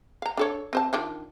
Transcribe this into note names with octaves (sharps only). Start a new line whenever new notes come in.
F5 A#5
D4 A4 C#5
C4 C5 A5
D#3 D4 F4